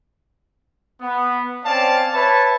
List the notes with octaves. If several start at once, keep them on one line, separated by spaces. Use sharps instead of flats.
B3
C4 C#4 D5 F5 A5
B4 C#5 E5 A5